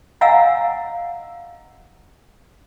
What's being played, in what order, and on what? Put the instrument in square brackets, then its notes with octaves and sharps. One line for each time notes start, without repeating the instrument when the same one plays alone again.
[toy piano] D#5 F5 F#5 G#5 A#5 E6